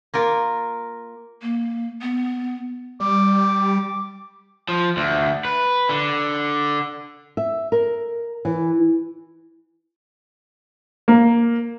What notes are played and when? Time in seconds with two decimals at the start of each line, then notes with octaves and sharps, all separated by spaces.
0.14 A#3 F4 A#4
1.42 A#3
2.02 B3
3.00 G3 D6
4.68 F3
4.97 D2
5.45 B4
5.89 D3
7.37 E5
7.72 A#4
8.45 E3
11.08 A#3